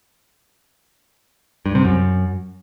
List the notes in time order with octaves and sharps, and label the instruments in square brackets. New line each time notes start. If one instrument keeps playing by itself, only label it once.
[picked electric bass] G2
C3
F#2